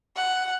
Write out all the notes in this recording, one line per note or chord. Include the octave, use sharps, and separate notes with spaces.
F#5